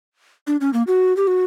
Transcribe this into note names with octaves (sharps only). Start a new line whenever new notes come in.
D4
C#4
A#3
F#4
G4
F#4